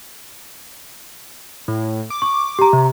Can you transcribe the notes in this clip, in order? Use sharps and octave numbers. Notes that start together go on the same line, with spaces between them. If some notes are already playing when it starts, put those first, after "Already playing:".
A2
D6
C#6
G4 A#5
C3